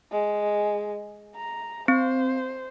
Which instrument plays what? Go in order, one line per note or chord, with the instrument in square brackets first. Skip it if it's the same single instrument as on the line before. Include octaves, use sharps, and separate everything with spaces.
[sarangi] G#3
A#5
[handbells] C4 [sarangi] C5